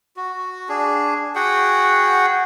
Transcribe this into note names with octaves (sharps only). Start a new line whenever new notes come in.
F#4
D4 G#4
F#4 G#4 F#5 G5